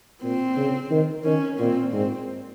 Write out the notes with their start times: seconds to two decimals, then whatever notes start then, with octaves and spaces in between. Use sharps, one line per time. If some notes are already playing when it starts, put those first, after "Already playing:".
0.22 A#2 C4
0.57 C#3
0.91 D#3
1.24 D#3 C#4
1.59 A#2 C4
1.93 G#2 C4